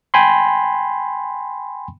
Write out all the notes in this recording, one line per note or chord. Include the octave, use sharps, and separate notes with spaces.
G5 G#5 B5 C6